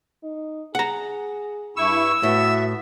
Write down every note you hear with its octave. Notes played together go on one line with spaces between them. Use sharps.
D#4
G#4 F#5 A#5
G2 E4 C#6 E6
A2 B3 F#4 E5